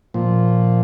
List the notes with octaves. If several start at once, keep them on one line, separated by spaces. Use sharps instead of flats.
A#2 F3